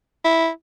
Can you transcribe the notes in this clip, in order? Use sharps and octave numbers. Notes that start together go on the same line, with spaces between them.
E4